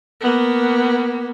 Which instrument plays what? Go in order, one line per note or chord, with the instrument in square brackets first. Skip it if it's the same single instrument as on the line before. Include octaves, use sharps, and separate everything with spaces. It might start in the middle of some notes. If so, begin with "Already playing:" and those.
[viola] A#3 B3